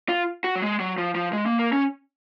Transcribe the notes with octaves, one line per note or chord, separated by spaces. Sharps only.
F4
F#4
F#3
G#3
F#3
F3
F3
G#3
A#3
A#3
C#4